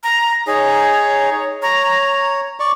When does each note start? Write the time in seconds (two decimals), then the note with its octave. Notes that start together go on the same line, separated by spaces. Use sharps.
0.03 A#5
0.47 D#4 G#4 C#5
1.62 C#5 A#5
2.60 D5 C#6